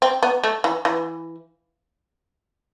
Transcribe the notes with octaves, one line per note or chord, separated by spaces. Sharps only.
C4
B3
A3
E3
E3